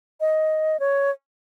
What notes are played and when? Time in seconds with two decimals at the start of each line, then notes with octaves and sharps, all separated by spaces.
0.20 D#5
0.80 C#5